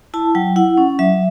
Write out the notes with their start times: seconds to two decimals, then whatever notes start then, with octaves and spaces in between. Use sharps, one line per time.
0.14 E4 A5
0.35 F#3 G5
0.56 E4 F#5
0.78 C#4
0.99 F#3 E5